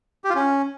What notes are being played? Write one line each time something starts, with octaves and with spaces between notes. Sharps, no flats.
G4
F4
C#4